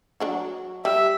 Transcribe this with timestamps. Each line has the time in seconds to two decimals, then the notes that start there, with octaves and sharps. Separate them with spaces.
0.20 F#3 D4 F#4
0.85 G3 E5